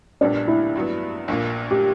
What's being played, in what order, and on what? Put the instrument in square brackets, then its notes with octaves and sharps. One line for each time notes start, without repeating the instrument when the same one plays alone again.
[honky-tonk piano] A#1 A#2 G3 B3 [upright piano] D4
[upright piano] E4
[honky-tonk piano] G2 F#3 B3
A#1 A#2 A#3
[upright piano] G4